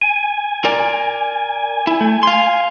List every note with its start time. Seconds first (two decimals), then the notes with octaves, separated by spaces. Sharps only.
0.02 G#5
0.65 A#4 D5
1.87 E4
2.01 A3
2.23 F5 C6